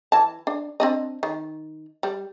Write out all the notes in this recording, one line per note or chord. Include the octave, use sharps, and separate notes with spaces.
E3 A5
D4
C4 D4 D#5
D#3
G3